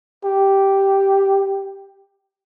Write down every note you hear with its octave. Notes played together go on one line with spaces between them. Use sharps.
G4